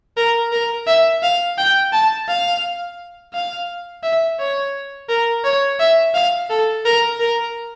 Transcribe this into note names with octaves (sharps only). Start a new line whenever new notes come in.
A#4
A#4
E5
F5
G5
A5
F5
F5
E5
C#5
A#4
C#5
E5
F5
A4
A#4
A#4